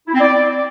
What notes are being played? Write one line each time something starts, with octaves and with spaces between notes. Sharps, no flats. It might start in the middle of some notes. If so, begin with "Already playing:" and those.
E4
C4
D5